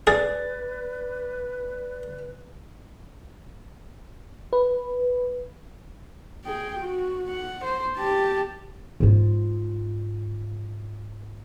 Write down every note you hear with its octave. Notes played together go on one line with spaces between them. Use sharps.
G#4 B4 D5 A6
B4
G#4 G5
F#4
F#5
C5
G4 A5
G#2 F4